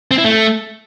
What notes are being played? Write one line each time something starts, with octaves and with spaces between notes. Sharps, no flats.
C4
E4
A3